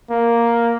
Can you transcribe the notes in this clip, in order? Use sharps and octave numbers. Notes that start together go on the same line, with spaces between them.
A#3